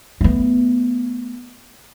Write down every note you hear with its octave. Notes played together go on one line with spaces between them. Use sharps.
A3 B3